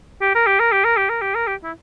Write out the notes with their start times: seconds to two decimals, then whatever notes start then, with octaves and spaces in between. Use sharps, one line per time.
0.21 G4
0.35 A#4
0.47 G4
0.60 A#4
0.72 G4
0.85 A#4
0.97 G4
1.09 A#4
1.22 G4
1.35 A#4
1.47 G4
1.63 E4